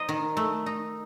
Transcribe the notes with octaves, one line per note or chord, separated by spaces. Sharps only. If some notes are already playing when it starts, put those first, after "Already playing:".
Already playing: D#4 C5 D#5
D#3
A3
D#4